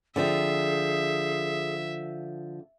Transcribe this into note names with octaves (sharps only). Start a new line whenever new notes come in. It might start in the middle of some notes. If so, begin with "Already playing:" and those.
D3 F3 C4 G#4 E5